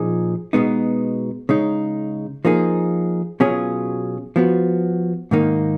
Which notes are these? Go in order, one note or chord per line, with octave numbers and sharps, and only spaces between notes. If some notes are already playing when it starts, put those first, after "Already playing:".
Already playing: A#2 F3 D#4 G#4
B2 G#3 B3 D#4
C#3 G#3 D#4
F3 A#3 D#4 G#4
B2 F#3 C#4 F4 G#4
F3 B3 F#4
G#2 D#3 A#3 D#4